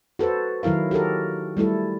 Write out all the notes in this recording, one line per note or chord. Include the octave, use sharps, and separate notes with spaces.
F#4 A4 B4 C5
D#3 F#3 E4 A#4 F5
F#4 G4 A4 A#4
G3 A3 E4 A4